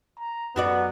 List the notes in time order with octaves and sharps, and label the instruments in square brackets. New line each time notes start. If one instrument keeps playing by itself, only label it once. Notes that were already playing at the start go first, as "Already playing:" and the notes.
[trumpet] A#5
[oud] F#2 F#4 D5 [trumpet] B3